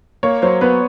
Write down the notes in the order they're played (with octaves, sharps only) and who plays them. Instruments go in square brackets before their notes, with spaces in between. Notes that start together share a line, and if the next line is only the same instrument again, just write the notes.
[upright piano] A#3 [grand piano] C#5
[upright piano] F#3 [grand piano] C5
[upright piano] B3 [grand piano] B4